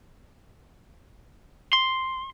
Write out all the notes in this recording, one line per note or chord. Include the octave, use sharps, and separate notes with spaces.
C6